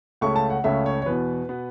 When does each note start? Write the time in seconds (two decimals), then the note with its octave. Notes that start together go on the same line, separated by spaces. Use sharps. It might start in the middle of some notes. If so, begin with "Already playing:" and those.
0.21 C#2 C#3 A3 C#4 C#6
0.36 A5
0.50 F#5
0.64 C#2 C#3 A3 C#4 E5
0.86 C#5
1.02 C#5
1.06 E2 B2 B3 B4
1.49 B2 B3